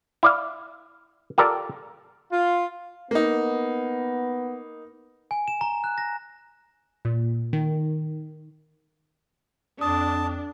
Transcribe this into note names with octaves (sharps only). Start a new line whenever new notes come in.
E4 D5 F5
F4 G4 A4 A#4 D5
F4
A#3 B3 D#4
G#5
E7
A#5
F#6
A#6
A#2
D#3
F2 D4 A5 D#6